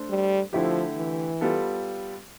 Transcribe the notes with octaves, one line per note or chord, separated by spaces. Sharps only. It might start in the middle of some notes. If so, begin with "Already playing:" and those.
Already playing: A3 D4 A4 C5
G3
D3 F3 A3 E4 G4
E3
G3 B3 F4 A4